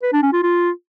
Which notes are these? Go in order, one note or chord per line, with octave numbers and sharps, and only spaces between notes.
B4
D4
C#4
F4
F4